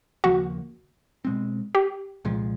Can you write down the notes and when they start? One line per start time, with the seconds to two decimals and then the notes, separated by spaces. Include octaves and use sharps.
0.24 D#2 C#3 F3 A#3 F#4
1.25 B2 G#3 C4
1.75 G4
2.25 C2 A#2 F3 G#3